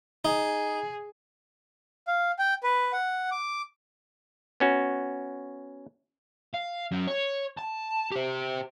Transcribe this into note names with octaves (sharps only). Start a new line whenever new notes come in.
D#4 G#4
F5
G5
B4
F#5
D6
B3 C#4 F#4
F5
F#3 C#4
C#5
A5
G4 C5